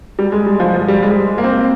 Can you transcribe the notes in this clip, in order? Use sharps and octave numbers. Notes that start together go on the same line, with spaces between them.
G3
G#3
G3
F3
F3
G3
G#3
A#3
C4